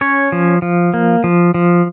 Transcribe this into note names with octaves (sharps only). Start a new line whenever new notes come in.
C#4 C#5
F3
F3
A#3
F3
F3